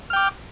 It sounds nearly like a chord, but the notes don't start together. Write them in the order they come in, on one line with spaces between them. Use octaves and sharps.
F6 G5 D6